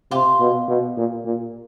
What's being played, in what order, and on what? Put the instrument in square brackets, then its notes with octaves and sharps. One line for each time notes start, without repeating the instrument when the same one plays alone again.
[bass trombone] C3 [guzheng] F4 G4
[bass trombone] B2
B2
A#2
A#2